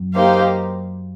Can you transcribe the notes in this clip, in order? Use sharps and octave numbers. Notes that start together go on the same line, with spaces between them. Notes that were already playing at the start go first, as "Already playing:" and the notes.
Already playing: F#2 F#3
A#3 D#4 G4 C5 F5